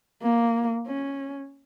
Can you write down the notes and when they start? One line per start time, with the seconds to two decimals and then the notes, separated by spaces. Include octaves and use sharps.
0.23 A#3
0.87 C#4